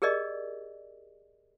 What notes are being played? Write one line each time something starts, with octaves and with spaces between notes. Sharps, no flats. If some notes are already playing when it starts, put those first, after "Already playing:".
G4 G#4 A#4 D5 D#5